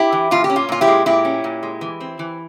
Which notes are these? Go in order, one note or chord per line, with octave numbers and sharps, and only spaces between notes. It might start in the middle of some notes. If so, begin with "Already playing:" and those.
Already playing: E4 G4
E3
A#2 F4
G4
C#4
F4
A#2 F4
E4 G4
G#3
A#2 E4 G4
C#4
A#2
G#3
E3
C4
E3